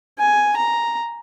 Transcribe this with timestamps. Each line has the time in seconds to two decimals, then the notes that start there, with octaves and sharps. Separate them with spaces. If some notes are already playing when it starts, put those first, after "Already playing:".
0.19 G#5
0.57 A#5